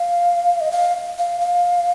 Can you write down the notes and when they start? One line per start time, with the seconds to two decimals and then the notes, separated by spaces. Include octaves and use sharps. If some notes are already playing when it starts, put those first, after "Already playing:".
Already playing: F5
0.61 D#5
0.72 F5
1.18 F5
1.41 F5